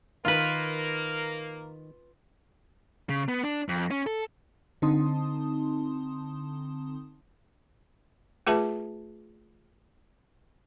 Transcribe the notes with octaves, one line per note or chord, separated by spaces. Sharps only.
D#3 A#3 F4 A#4 B4
C#3
B3
D4
F2
C#4
A4
D3 C4 D#4 A5 C6 D#6
A3 F4 G#4 B4 E5 A5